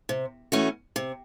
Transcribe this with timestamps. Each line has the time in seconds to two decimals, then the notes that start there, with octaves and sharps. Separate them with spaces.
0.09 C3
0.52 E3 A3 C#4 F#4
0.96 C3